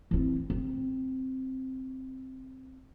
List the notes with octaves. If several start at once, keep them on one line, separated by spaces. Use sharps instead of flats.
E3 C4
C4